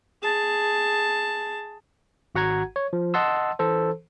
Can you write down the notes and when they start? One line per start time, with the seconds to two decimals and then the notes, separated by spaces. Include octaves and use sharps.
0.22 G#4 A5
2.35 G#1 F#4 F#5 A#5 G#6
2.76 C#5
2.93 F3
3.14 D#5 F#5 A5 C6 E6
3.59 E3 A4 C5